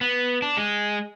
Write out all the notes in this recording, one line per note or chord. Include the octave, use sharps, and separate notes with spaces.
B3
D4
G#3